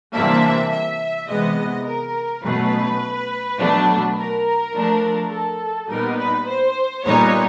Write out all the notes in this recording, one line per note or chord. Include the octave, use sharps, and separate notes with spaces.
C3 E3 G3 A#3 D4 E5
E5
C3 E3 G#3 B3 D#5
A#4
B2 F#3 A3 C#4 B4
B2 F#3 A3 D4
A#4
F3 A3 D4
A4
A#2 G3 B3 D#4 A#4
B4
C5
A#2 G3 B3 D#4 C#5